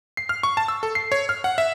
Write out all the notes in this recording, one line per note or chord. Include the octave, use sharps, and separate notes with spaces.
C7
F6
C#6
A5
E6
A4
C7
C#5
F6
F#5
E5